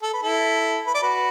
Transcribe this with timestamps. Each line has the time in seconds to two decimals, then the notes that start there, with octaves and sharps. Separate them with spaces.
0.02 A4
0.13 B4
0.23 E4 A4
0.87 B4
0.94 D5
1.02 F#4 B4